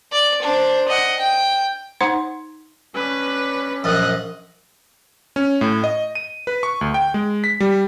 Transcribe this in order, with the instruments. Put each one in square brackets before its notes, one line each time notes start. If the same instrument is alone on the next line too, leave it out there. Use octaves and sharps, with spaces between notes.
[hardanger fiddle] D5
D4 C5
D#5 F#5
G5
[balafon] D#4 C5 F#5 C6
[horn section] C#4 D4 [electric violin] B4
[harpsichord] A#1 F#2 [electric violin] D#5 F#6
[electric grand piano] C#4
A2
D#5
D#7
B4
C#6
D2
G5
G#3
B6
G3